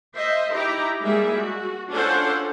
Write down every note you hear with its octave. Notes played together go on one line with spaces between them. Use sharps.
C5 D#5 E5
D#4 E4 G4 A#5
G3 G#3 A#3 G#4 E5
F#4
C#4 D4 F4 A4 C5 F#5